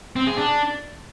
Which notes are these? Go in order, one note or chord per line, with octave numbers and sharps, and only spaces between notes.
C4
G#4
D4